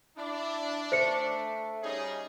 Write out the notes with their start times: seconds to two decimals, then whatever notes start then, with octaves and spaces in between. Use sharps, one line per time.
0.17 D4 E4
0.92 A3 C5 C#7
1.83 G3 C#4 D#4 G#4